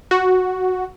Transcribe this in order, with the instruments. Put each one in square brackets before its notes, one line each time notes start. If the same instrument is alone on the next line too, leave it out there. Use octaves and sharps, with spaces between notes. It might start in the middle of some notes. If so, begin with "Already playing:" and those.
[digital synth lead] F#4